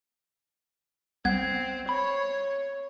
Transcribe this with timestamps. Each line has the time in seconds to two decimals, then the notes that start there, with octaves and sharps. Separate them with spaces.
1.25 C2 B3 C4 F#6 G#6
1.89 C#5 B5